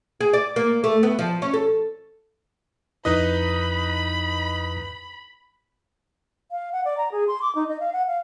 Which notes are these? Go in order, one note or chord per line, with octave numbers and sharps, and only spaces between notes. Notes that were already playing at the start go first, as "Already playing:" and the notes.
G#4
D5
A#3
A3
B3
F3
C#4
A4
F2 D#4 E4 B4 D#5 B5
F5
F#5
D5
A#5
G#4
C6
D6
D#4
D#5
F5
F#5
F5